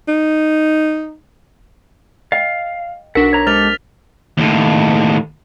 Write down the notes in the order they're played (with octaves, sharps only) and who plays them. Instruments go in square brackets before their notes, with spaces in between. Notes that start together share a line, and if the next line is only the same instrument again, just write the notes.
[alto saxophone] D#4
[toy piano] D#5 G5 [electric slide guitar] F5
[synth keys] B1 D4 [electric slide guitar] F#4 F#5 [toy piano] A#4 [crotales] B6
[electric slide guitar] C#5 A#5
[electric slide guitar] G#3 G4 A4 [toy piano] C5 [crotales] F6 A6 F7
[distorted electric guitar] D#2 A2